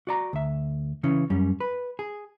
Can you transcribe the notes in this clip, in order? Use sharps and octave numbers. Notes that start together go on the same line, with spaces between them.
F#4 D5 A#5
D2 E5
C#3 E3 C#4
F#2 G3 C#4
B4
G#4